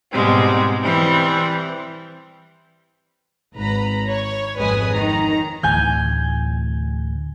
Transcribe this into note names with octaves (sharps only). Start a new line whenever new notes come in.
G#2 B2 G3 G#3 C4
E3 G3 C4
G#1 B4 A#5 B5
C#5
G#1 F2 G#3 B4 G#5 D#6
D#3 A#5
D2 A2 E3 G#5 G6